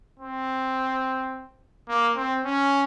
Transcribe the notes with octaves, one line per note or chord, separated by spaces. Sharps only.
C4
A#3
C4
C#4